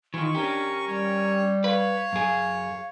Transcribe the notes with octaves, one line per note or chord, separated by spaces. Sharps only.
D#3 E3 F4 C#6
C#4 D4 G4 A#4
G3 C#5
B4 C#5 F5
F#2 G#4